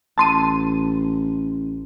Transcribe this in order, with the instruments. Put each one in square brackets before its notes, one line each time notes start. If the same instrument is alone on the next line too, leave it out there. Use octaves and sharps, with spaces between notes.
[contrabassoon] A1 [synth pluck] A5 C6 D#7